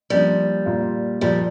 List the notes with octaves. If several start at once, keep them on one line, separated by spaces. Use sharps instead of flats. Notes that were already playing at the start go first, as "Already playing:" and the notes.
F3 G3 A#3 D4
A#2 A#3 F4
A#2 F3 G3 A#3